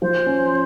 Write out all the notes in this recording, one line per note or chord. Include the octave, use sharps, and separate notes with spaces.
F3 C5
C#4